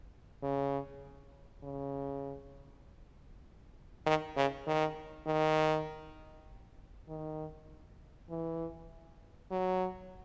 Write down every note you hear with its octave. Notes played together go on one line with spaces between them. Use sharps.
C#3
C#3
D#3
C#3
D#3
D#3
D#3
E3
F#3